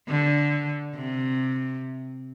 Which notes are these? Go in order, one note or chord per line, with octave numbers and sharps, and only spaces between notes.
D3
C3